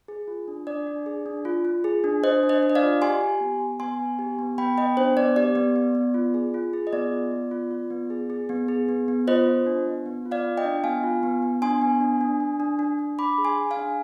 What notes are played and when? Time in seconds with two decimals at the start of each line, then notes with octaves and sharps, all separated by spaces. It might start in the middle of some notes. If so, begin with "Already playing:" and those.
0.08 G#4
0.27 F4
0.48 D4
0.67 D4 D5
0.86 D4
1.06 G#4
1.26 D4
1.45 F4
1.65 F4
1.84 G#4
2.04 D4
2.23 D4 C5 D#5
2.43 D4
2.49 C5 D#5
2.63 D4
2.70 D#5
2.75 D5 F5
2.82 F4
3.02 G4 G#5 C6
3.21 G4
3.41 B3
3.60 B3
3.80 B3 G#5 C6
3.99 B3
4.19 G4
4.39 B3
4.58 B3 G5 B5
4.78 B3 D#5 G5
4.97 D4 C5
5.17 B3 D5
5.36 G4 D5
5.55 B3
5.76 B3
5.95 B3
6.14 F4
6.34 G#4
6.54 F4
6.73 G#4
6.87 D#5
6.93 B3 D5
7.12 F4
7.31 B3
7.51 F4
7.71 F4
7.90 B3
8.10 G#4
8.30 G#4
8.49 B3
8.68 G#4
8.89 B3
9.08 B3
9.28 F4 C5 D#5
9.47 F4
9.66 D4
9.86 B3
10.06 B3
10.25 F4
10.31 D5 F5
10.45 F4
10.57 D#5 G5
10.64 D4
10.84 B3 F5 G#5
11.03 F4
11.23 B3
11.43 B3
11.62 D4 G#5 C6
11.82 B3
12.01 D4
12.21 D4
12.40 D4
12.60 D4
12.79 D4
12.99 D4
13.19 D4 B5 D6
13.38 G#4
13.44 G#5 C6
13.58 G#4
13.71 F5 G#5
13.77 D4